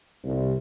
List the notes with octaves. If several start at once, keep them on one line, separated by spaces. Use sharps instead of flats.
C2